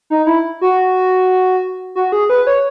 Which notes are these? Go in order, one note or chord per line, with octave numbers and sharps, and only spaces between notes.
D#4
E4
F#4
F#4
G#4
B4
C#5